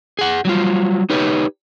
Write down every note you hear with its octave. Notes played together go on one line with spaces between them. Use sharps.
G#4 F#5
F#3 G3 F4
D#4 G4 B4 C#5